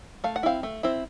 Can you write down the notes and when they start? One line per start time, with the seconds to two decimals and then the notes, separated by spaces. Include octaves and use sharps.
0.24 A3 F5
0.36 F#5
0.43 C4 E4 F5
0.63 A3
0.83 C4 E4